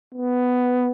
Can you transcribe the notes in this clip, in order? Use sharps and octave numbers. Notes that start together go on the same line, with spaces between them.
B3